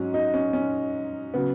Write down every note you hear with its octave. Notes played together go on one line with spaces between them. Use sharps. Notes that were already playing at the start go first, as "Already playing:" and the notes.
Already playing: G#2 F#3 C#4
D#4
C#4
C#4
C#3 F#3 B3